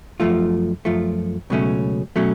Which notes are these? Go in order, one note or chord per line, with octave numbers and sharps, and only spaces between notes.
F#2 F3 A3 F4
F#2 F3 A3 F4
C#2 B2 F#3 A3 C#4
B2 F#3 A3 C#4